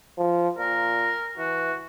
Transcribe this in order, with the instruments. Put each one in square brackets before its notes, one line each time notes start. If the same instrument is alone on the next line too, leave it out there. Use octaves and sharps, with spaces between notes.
[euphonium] F3
[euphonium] A#2 [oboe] A#4
[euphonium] E3 [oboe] F#4